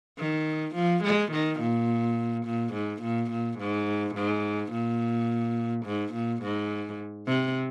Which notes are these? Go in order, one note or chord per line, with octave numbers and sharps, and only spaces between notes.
D#3
F3
G#3
D#3
A#2
A#2
G#2
A#2
A#2
G#2
G#2
A#2
G#2
A#2
G#2
C3